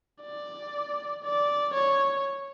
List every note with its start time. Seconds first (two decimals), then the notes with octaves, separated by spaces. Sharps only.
0.22 D5
1.24 D5
1.74 C#5